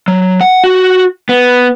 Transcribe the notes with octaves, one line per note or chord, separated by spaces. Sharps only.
F#3
F#5
F#4
B3